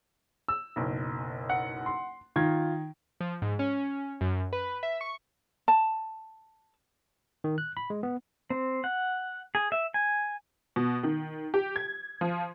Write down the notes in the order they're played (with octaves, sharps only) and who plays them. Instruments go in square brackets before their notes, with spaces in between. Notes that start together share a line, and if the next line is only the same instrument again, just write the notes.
[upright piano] E6
F#1 B1
[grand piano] F#5
[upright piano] C6
[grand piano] D#3 G#6 [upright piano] F4
[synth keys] F3
G#2
C#4
F#2
B4
E5
C#6
[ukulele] A5
[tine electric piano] D#3
F#6
B5
G#3
B3
[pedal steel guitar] C4
F#5
G#4
E5
G#5
[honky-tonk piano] B2
D#3
G4
G#6
F3